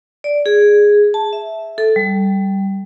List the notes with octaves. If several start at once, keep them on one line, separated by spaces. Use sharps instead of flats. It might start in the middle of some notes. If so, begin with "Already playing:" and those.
D5
G#4
A5
E5
A4
G3